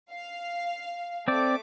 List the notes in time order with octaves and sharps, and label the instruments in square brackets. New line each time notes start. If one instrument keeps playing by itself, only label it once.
[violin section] F5
[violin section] A3 D6 [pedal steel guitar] C4 D5